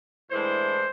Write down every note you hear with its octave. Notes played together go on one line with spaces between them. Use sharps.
A2 E3 G#3 D4 C5